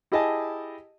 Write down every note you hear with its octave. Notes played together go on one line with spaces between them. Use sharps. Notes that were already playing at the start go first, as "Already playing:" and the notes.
E4 G4 G#4 D#5 G#5 A5